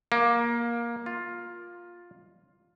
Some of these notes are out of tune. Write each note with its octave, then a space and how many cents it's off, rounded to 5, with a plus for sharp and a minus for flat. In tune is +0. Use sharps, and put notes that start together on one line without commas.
A#3 +15
F4 +10